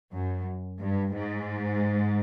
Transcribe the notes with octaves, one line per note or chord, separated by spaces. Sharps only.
F#2
G2
G#2